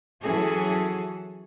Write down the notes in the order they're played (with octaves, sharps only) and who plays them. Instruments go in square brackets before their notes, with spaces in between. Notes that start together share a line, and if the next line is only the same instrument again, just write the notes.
[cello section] E3 F#3 C#4 F#4 G#4 A4